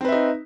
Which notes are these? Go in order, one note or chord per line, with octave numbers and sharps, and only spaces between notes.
C4 D#4 B4 E5